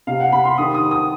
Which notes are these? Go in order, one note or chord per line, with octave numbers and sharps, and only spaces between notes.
C3 F5
F#5
C3 B5
C6
D#3 D#6
D#6
D#3
D#6